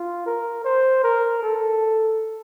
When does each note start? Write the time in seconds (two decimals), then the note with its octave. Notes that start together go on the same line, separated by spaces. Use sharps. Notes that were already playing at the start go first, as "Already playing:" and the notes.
Already playing: F4
0.26 A#4
0.65 C5
1.04 A#4
1.43 A4